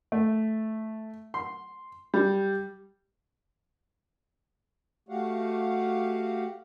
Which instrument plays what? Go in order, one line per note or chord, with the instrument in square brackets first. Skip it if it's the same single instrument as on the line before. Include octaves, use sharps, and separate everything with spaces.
[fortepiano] A3
C6
G3
[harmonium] A3 F#4 G4 F5 F#5